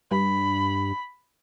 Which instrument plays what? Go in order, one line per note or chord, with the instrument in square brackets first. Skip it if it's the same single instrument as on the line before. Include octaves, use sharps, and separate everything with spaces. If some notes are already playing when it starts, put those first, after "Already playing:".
[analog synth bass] G2 [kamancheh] B5